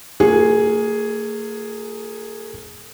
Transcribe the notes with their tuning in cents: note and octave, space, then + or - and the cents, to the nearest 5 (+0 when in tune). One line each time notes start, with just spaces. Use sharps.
A#3 -40 F4 +40 G#4 +0